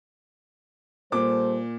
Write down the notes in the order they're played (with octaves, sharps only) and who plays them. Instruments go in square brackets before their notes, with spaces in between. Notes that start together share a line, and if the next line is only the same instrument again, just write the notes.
[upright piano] A#2 D6 [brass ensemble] G3 A4 C5